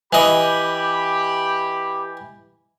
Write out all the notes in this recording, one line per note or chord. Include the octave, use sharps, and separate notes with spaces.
E3 G4 D#5 B5